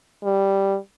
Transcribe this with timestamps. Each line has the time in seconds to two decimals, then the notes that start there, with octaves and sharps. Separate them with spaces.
0.24 G3